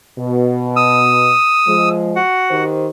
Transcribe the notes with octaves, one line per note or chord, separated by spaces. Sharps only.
B2
D#6 E6
F3 G#3
F#4 F#5
D#3 G4 C5